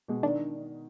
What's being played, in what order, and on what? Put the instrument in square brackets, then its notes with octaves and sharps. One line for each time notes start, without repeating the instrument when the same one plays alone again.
[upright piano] B2 G#3
[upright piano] D#3 [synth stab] D4